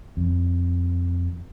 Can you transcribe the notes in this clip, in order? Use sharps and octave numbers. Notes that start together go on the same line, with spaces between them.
F2